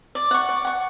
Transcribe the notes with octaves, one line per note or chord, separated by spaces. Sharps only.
D5
F#5 C#6
D5
F#5 C#6